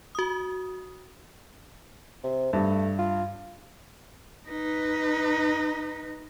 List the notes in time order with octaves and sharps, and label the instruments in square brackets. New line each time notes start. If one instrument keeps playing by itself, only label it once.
[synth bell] F#4 D#6
[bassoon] C3
[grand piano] G2 [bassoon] A3
[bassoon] F4
[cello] D#4 B4